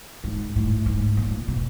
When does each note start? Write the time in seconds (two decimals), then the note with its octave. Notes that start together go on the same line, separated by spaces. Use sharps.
0.24 G#2
0.56 A2
0.86 G#2
1.17 A#2
1.48 B2